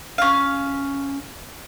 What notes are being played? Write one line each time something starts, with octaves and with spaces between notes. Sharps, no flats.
C#4 F5